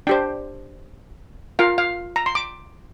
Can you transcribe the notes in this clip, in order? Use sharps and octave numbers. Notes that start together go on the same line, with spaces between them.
D4 G4 C5 G5
F4 A#4 F5
F5
A#5
C6
D6